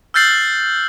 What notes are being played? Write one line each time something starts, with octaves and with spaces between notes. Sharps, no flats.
E6 F6 G6 A6 C7 F#7